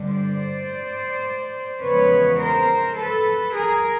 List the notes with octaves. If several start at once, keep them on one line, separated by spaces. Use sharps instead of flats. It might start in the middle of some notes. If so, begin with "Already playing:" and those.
Already playing: G2 D3 G3
C5 D5
E2 C#3 F3 G#3 B3 B4 C#5
A#4 C5
A4 B4
G#4 A#4